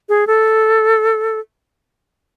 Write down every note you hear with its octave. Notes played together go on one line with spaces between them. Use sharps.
G#4
A4